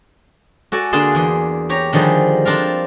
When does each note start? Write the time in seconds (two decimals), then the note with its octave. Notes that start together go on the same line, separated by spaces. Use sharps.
0.72 F#4 A4 D5 G#5
0.93 D3 A#3 D4 G#4 A5 C6
1.15 E2 G#4 C6
1.69 G4 C#5 A#5
1.93 D3 D#3 F3 G3 G#4
2.45 C4 D4 F4 A#4